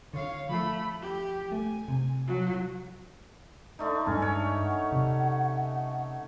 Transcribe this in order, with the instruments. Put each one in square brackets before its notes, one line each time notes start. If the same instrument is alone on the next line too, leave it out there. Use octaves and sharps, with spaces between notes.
[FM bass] D3 [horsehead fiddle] C#5 F5
[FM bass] F3 [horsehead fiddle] A3 B5
[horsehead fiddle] G4
[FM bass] A3 [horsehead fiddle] G#5
[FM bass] C3
[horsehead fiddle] F#3
[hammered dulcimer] D3 A3 D#4 [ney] D5
[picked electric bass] G2 G#3 D4 [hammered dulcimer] C#4 [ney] G#5
[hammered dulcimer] C#5
[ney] F#5
[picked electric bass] C3